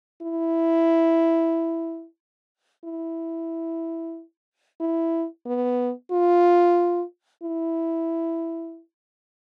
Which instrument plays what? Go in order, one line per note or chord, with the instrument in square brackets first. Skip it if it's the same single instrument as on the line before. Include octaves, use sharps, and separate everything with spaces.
[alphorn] E4
E4
E4
B3
F4
E4